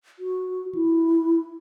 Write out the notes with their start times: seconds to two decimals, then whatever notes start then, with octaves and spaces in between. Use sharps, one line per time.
0.19 F#4
0.75 E4